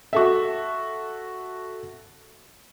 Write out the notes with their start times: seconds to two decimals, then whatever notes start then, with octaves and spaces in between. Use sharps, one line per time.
0.13 F#4 A4 E5